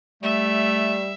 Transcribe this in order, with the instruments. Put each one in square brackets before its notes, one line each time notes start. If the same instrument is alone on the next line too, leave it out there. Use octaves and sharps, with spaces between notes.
[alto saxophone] G3 [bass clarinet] A3 [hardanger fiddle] E5